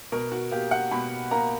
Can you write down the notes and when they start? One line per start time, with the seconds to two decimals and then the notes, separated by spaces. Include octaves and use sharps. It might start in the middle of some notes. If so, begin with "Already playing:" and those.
0.12 B2 A#4
0.32 F#4
0.52 A#3 G4
0.71 F#5
0.91 B2 B5
1.31 A#3 A#5